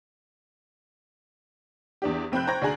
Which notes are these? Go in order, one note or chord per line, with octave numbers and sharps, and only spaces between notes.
E2 D4 G4
F1 C4 G5 B5 F#6 G6
C5 G5 A#5 C#6 G#6 A#6
D2 D4 G#4 G#5 A#5 F#7